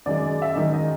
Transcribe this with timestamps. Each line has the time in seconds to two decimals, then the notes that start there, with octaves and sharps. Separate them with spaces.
0.06 F#2 D#3 G#3 D5
0.42 E5
0.56 F#2 D#3 G#3 D#5
0.73 D#5